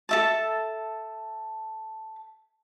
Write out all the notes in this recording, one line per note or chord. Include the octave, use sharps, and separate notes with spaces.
A4 E5 A5